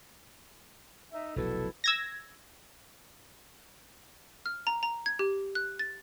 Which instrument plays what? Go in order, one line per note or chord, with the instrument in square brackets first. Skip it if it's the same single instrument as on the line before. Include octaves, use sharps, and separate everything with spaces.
[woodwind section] D#4 E5
[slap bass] F1 B1 F#3 [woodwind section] B2 E4 A4
[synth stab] E6 G#6 A#6
[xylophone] F6
A#5
A#5
G#6
G4
F#6
A6